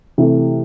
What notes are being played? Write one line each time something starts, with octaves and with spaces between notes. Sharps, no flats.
C3 E3 A3